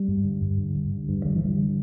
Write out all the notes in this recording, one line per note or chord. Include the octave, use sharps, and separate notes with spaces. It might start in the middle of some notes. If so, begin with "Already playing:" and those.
Already playing: G3
G2
D3
G2
D3
G2
D3
G2
D3 G3
E3
D3 G3
D3